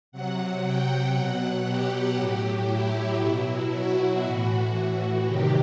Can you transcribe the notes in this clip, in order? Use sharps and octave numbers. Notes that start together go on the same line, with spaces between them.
C3 F#3 F#5
G5
B2 F#3 F#5
G4
A2 F#3
E4
B2 F#3 E4
F#4
A2 E3
F#4
C3 D#3 F#3 G4